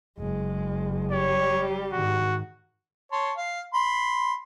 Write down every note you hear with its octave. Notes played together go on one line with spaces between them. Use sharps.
F#1 G#3
G3 G4 C#5
G#2 D#3 F#4
C#5 A5 C6
F5
B5 C6